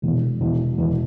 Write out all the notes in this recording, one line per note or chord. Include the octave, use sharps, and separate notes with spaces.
E1 E2 B2
E1 E2 B2
E1 E2 B2